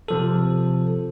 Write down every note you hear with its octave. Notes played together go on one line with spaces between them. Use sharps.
C3 F3 A4